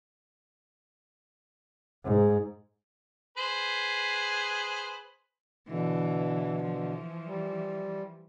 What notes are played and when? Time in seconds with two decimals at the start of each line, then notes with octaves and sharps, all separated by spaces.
2.04 G#2
3.38 G#4 B4 C5
5.68 B2 D3 E3
6.64 E3 F3
7.26 G3